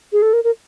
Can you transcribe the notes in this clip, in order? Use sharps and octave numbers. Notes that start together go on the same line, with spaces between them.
G#4
A4
A#4
A#4